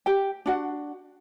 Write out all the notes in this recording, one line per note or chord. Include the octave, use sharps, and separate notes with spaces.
G4 G5
D4 F#4 F#5